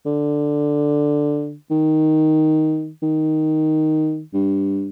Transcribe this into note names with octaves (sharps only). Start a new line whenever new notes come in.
D3
D#3
D#3
G2